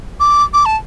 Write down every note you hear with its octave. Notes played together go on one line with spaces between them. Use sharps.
D6
D6
A5